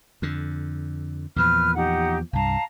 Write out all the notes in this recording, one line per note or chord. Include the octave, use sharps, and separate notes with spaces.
F2 D3
E2 A#2 F3 B4 F6
D#4 G4 F#5
C2 G2 F5 A5 A#5